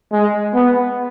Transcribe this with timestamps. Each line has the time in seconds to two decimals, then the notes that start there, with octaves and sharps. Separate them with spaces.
0.13 G#3
0.55 B3